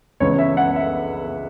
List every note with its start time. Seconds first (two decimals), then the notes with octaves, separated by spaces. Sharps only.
0.20 C#2 C#3 E3 B3 C#5
0.39 E5
0.57 F#5
0.76 E5